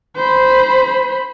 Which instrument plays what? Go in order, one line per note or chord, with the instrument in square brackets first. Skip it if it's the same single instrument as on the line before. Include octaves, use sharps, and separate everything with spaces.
[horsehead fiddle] C5 B5